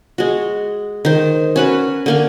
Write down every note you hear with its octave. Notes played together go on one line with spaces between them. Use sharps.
G#3 F#4
D#3 C5
C#4 F#4 B4
D3 A#3 G#5